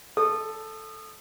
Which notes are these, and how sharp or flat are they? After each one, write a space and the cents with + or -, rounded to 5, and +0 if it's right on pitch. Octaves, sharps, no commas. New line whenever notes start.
A4 +0 D#6 -25